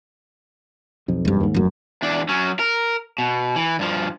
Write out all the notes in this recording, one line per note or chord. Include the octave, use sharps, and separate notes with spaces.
B1 F2
E1 G2
D#2 G#2
F1 F#2
E2 D4
F#3 C#4
A#4
B2
E3
G2 F3